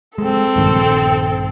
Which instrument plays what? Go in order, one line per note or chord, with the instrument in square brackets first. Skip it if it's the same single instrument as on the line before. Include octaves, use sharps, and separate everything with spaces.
[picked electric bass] G#3 [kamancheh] C4 A4
[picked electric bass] A#1 G2 D#3